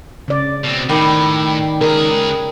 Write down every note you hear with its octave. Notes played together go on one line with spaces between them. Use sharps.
C#3 D5
B2 C4
A2 D#3 G3
C#2 G#4 A#4